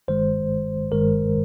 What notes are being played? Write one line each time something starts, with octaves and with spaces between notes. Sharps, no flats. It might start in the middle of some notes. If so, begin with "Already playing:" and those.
G1 G2 D#3 G#3 C5
G1 G2 D#3 G#3 A#4